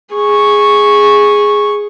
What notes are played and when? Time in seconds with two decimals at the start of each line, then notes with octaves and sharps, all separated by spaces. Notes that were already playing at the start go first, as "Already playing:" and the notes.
0.14 G#4 C#6